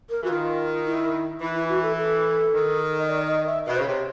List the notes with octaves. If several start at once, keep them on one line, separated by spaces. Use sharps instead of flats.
A#4
E3 F#4
D#3 F4
E4
E3 E4
E4
F#4
A4
A4
D#3
D#5
D5
D#5
E5
B2 D#5
C#3 C5
C3 C#5